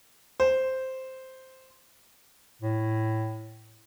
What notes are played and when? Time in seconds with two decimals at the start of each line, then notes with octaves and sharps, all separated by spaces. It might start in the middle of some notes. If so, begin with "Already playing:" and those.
0.40 C5
2.62 A2